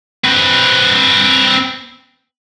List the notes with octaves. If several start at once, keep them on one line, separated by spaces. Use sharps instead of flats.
C4 B4